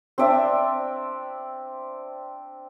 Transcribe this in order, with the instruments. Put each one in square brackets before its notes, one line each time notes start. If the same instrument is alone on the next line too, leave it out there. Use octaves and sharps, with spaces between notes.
[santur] C4 D4 D5 E5